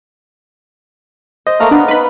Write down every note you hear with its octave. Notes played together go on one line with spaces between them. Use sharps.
C5 D#5
A3 A#3 F5 A#5 F6
B3 D4
D#4 B4 B5